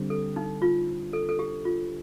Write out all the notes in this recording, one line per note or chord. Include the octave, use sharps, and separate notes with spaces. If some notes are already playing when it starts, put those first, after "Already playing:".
Already playing: D3 G3 C4
A4
D#4
F4
A4
A4
G4
F4